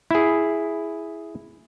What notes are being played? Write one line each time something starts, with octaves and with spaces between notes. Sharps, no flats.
E4 G#4